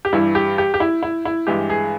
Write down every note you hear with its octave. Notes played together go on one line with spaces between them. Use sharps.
G4
G2 E3 G3 E4
G4
G4
G4
E4
E4
E4
G2 E3 G#3 G4
G#4